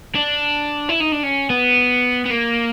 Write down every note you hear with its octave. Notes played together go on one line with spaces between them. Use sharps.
D4
E4
D#4
D4
C#4
B3
B3
A#3